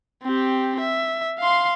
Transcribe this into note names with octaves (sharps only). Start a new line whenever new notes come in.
C4 G4
E5
F5 C6